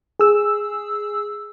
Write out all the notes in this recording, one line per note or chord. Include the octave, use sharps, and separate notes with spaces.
G#4 E6